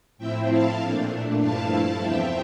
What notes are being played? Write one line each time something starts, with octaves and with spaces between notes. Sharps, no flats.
A2 F3 C4 E4 E5 G5
F5 A5
A#2 A3 D4
G2 F3 A3 E4 F5 A5
E2 C3 F3 E5 G5